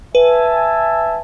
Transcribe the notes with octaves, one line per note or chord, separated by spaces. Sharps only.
B4 E5 G#5 A5